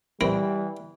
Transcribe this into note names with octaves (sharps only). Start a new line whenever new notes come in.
E3 G3 C4 E4 A#4